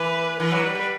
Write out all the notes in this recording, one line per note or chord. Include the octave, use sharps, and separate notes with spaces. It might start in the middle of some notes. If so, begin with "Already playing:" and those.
Already playing: E3 B4
E3 B4
F#3
G3
G3